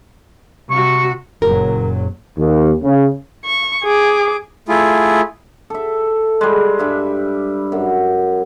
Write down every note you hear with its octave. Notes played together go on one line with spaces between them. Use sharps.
C3 F#4 C#6
F#1 A#2 F#3 A#4
D#2
C#3
C#6
G#4 D6
A3 E4 F4 G#4
A4 E5
G3 G#3
G2 E5 B5
F#2